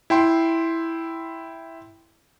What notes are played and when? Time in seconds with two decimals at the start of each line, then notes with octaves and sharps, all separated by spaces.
0.10 E4 G5 C6